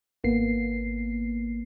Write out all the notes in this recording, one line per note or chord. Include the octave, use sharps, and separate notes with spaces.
G#1 A#3 B3 C7